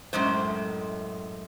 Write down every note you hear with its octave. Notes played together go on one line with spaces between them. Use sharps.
F#2 A2 G#3 C5